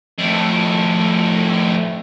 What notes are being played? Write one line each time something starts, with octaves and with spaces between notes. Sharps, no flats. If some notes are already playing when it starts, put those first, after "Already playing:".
F2 A2